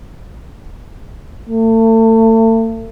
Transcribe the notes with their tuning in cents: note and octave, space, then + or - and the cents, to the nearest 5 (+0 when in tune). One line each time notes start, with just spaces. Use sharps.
A3 +35